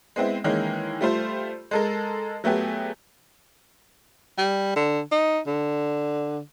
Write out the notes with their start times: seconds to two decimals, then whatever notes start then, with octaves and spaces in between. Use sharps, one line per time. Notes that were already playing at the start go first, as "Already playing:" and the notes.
0.16 G#3 B3 C4 E4
0.44 D#3 E3 G#3 A#3 C#4
1.01 G3 A3 F4 C5
1.71 G#3 A4 A#4
2.44 F#3 A3 B3 G4 G#4
4.38 G3
4.76 D3
5.11 D#4
5.46 D3